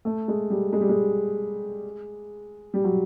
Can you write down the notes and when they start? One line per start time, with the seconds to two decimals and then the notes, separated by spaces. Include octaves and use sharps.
0.05 A3
0.28 G#3
0.50 G3
0.73 G#3
0.81 G3
0.89 G#3
2.74 G3
2.84 F#3